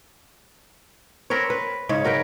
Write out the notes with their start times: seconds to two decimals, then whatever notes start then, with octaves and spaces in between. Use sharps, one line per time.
1.30 C4 A#4 B4 C#5
1.50 B4
1.89 G#2 C#3 C#5
2.05 F#3 A#4 B4 G5